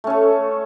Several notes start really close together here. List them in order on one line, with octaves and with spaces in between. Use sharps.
A3 C#4 A4